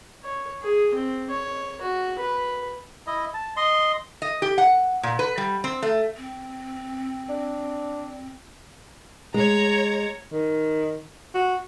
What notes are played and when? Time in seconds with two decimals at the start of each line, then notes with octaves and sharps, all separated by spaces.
0.24 C#5
0.62 G#4
0.95 C4
1.30 C#5
1.82 F#4
2.19 B4
3.07 E4 D#5
3.34 A5
3.56 D#5 C6
4.22 D#5
4.42 G4
4.58 F#5
5.03 A#2
5.19 B4
5.38 G3
5.64 C4
5.82 A3
6.17 C4
7.29 D4
9.34 G#3 C#5 A#5
10.32 D#3
11.34 F#4